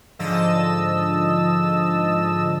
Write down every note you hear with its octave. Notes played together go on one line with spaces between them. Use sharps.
G#2 D3 F3 D#5 A5 E6